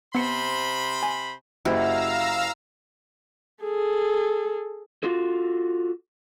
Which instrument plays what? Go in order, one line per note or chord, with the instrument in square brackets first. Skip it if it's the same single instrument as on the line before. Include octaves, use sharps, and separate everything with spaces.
[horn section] C3 C5 B5 [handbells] B3 C#7
[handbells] G#5
[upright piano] F#1 [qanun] E4 F#4 G4 [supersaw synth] F5 A#5 E6
[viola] G#4 A4
[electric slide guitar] F4 F#4 A4